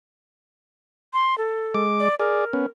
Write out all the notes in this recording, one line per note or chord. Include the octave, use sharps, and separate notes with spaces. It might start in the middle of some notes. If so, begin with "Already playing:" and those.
C6
A4
G#3 D6
D5
G#4 A#4 D5
B3 C#4